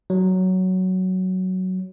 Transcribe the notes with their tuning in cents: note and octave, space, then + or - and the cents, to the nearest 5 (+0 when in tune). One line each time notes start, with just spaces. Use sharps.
F#3 +5